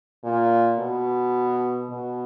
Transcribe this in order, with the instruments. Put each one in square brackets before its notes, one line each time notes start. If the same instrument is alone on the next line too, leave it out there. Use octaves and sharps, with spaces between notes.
[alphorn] A#2
B2
B2